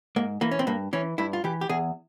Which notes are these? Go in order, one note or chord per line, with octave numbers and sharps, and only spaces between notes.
G#2 A#3
E3 A#3
C#4
C4
G2 A#3
E3 C#4
G2 E4
F4
E3 G4
G4
E2 G#4